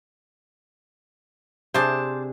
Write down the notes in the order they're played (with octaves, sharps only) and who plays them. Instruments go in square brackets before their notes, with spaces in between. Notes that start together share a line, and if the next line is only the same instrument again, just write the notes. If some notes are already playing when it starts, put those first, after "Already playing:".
[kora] C3 D4 G#4 [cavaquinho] C5 A5 D6